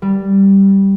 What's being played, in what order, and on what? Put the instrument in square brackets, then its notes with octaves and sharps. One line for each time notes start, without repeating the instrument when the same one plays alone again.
[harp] G3